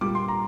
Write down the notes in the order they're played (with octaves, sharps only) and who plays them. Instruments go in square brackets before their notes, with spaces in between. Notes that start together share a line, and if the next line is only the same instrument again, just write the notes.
[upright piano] A#2 G3 D6
C6
A#5